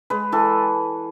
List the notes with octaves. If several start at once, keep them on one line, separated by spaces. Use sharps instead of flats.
G#3 B4
E3 A4